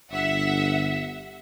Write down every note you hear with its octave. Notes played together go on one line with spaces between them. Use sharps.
G1 E5 F#5